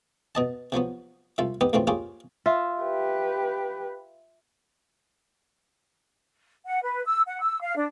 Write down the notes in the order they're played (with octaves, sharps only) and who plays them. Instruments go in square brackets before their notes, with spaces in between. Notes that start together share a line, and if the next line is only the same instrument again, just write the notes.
[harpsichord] B2 D#5 A5
C3 F3 F#3 B3
C2 F4 E5
B3 D#4 G4 B4
D2 A2 C#3 E3 F3 C4
A#3 C#4 F4 G4 G#4
[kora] F4 [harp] E5
[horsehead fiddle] G4 B4
[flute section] F#5
B4
E6
F#5
E6
F5
D4